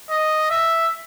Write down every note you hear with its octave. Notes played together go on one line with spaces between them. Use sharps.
D#5
E5